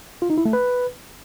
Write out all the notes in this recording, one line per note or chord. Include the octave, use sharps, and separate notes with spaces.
F4
D#4
E4
A3
B4